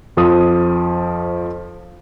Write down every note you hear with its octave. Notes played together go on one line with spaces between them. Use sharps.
F2 F3 D#6